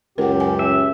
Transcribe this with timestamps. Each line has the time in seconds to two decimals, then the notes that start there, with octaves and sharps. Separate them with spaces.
0.18 C#2 F#2 G4 A#4 F#5
0.40 G#5
0.59 E5